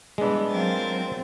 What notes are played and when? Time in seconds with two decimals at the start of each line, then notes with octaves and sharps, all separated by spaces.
0.18 B2 E3 G3 G#3 B3 D4
0.49 F#3 C4 F4 A#4 A6